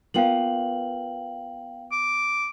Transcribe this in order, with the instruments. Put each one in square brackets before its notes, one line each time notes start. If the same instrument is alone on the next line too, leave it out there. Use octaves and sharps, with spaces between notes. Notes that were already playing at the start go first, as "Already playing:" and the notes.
[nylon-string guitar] A#3 B3 F4 [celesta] F5 G5 F#7
[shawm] D6